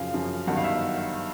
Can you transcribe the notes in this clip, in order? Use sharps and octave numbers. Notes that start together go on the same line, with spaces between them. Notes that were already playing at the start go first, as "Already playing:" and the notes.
Already playing: F#2 C#3 F3 F5
F#2 C#3 F3
G1 G2 D#3 F#3 F#5
F5
E5